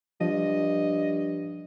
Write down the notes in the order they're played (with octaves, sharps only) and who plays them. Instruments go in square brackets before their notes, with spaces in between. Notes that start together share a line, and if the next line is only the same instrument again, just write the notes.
[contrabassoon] G2 [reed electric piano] F3 [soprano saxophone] D#5